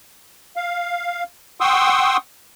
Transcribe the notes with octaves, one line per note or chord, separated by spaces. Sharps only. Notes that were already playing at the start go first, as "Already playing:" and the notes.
F5
F#5 G5 C6 C#6 D#6 E6